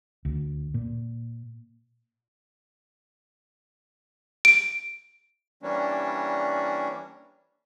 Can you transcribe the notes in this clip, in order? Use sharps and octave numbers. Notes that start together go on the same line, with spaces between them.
D2
A#2
D7
E3 G3 A#3 C#4 D4